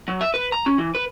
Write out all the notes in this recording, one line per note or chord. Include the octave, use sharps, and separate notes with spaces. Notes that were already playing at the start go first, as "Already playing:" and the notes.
F#3
E5
B4
A#5
C#4
E3
B4